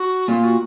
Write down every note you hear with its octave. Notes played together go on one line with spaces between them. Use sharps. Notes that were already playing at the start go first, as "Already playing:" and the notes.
Already playing: F#4
A#2 F4
F#4